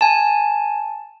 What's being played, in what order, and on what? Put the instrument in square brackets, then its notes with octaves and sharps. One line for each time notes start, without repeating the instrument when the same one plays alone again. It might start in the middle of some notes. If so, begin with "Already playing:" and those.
[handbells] G#5 A5